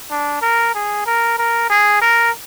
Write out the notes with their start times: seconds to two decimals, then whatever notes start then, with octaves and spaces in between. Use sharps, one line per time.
0.11 D4
0.42 A#4
0.75 G#4
1.06 A#4
1.38 A#4
1.70 G#4
2.02 A#4